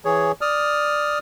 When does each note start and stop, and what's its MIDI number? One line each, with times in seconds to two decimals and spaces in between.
0.05 0.32 52
0.05 0.32 68
0.05 0.32 73
0.41 1.19 74
0.41 1.19 87
0.41 1.19 89